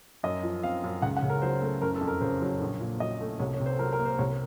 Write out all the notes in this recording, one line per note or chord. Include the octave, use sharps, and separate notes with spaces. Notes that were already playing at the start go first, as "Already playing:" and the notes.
F#2 D#5
F3
C4 F5
F#2
C#2 F#5
F#5
C#3
A#4
F#3 C5
A3
F#1 A#4
A4
F2
A#4
C#3 C5
F#3
A#1
A#2
F#3 D#5
A3
C2 C#5
C#5
C3
C5
A4
F#3 A#4
A#4
A#3
C5
C2 C#5